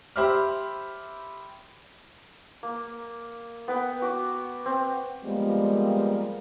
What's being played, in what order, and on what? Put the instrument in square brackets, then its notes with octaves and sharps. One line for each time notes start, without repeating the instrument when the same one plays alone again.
[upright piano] G4 C5 E5 B5 D6 F6
[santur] A#3
B3 B4 G5
F#4 D6
C4
[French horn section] F3 G3 G#3 A#3 B3